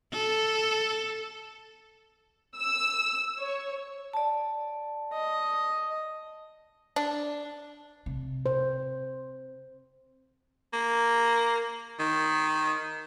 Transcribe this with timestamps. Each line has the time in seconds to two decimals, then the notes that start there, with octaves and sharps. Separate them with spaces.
0.13 A4
2.58 E6
3.39 C#5
4.13 D5 A5
5.14 D#5
6.96 D4
8.06 C3
8.46 C5
10.73 A#3
11.99 D#3